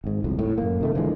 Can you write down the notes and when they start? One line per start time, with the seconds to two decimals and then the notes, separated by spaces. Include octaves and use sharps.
0.04 G#1 G#2
0.24 D#1 C2 F2
0.39 A2
0.58 F#2 A#3
0.81 C3 D#3 A3
0.95 D3 E3 F3 G#3